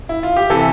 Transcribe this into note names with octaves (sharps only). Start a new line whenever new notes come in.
E4
F4
G4
C3 E3 A4